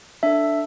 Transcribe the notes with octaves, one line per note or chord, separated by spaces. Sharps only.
D4 A4 E5